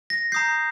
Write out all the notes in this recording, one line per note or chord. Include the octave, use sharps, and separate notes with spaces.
A#6
A#5 D#6 G6 C7